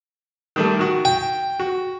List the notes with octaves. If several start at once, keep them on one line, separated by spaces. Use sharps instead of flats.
D#3 G3 A3
D#3 F#4
G5
F#4